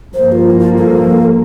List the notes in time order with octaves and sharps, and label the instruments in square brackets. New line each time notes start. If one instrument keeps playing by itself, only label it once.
[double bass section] G2 F3 A#3 [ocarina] C5
[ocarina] F4
E4
F4
A4